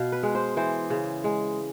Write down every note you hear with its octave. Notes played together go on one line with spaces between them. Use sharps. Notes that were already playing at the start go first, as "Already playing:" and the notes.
Already playing: B2 F5
B4
G#3
C5
E3 C5
C#3
G#3